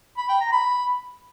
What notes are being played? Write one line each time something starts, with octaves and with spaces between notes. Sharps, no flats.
B5
G5
A#5
B5